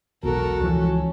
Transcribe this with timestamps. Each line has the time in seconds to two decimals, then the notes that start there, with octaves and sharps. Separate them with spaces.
0.23 E1 B1 F#4 A4 A#4
0.61 C#2 E3 F3 C#4